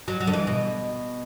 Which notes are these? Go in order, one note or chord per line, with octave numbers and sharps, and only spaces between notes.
F#3
F#3
D3
E3
B2